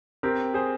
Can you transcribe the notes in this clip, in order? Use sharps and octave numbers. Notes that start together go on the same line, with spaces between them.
C4 G4 A#4
G#4 C5